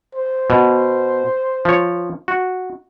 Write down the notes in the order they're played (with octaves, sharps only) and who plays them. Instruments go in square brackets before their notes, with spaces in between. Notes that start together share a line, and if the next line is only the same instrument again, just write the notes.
[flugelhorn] C5
[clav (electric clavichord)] B2
F3 C#5
F#4